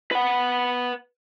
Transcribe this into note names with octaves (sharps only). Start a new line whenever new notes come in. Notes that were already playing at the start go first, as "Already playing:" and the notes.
B4 F#5